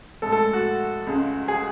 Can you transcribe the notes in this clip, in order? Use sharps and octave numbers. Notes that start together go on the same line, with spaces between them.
A2 G#3 A4
A4
F#4
C#2 C#3 G#3
G#4